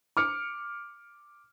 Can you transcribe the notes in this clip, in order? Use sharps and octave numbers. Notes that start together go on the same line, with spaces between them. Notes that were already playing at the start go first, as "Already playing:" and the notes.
D6 F6 C#7